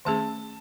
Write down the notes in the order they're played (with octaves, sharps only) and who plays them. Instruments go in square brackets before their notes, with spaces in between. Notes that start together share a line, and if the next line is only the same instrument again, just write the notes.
[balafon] D#3 A3 C#4 G#4 [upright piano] A5